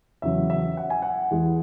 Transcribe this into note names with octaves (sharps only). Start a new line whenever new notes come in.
E2 C#3 F#3 E5
E5
F#5
G#5
F#5
E2 E3 G#3